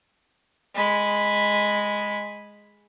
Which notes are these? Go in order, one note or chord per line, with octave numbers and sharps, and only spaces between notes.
G#3 B5